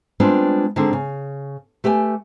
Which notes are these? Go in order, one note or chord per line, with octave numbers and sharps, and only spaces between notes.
G3 G#3 B3 C4 D4 F4
D3 D#3 G#3 C4 D4
C#3
A3 G4 B4 G5 G#5